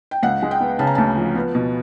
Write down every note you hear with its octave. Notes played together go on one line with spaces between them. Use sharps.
G5
C#2 F#5
G#3
G5
B3
C#3 A5
A#5
D2 A5
F3
B3
B2